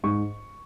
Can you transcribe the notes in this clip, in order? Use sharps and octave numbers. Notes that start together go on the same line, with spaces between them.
G#2 C#6